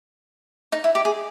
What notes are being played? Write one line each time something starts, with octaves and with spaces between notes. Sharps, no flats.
D#4
E4
G4
G#4